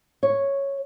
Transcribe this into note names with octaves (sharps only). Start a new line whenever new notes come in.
C#5